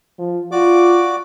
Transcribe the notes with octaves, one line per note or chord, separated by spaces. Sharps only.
F3
F4 F#4 D5 D6